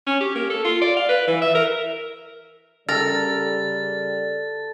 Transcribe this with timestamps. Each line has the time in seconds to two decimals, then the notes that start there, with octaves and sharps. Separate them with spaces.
0.06 C#4
0.20 G4
0.35 A#3
0.50 A4
0.64 F4
0.81 D5
0.96 F5
1.09 B4
1.27 E3
1.42 E5
1.55 A#4
2.89 C#3 G3 A4 A#4 D5 F5 A6